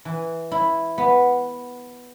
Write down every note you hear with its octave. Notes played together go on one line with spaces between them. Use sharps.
E3
E4
B3